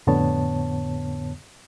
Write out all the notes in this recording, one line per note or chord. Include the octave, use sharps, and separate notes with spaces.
F2 A2 D3 B3 C#5 A5